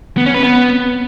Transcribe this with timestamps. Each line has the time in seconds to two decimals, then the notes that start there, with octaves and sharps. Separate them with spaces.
0.17 B3
0.26 C#4
0.34 B4
0.43 B3